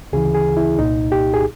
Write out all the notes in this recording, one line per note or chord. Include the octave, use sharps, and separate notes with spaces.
D2 C#3 E3 G#4
G#4
E4
C2 A#2 D#4
G4
G#4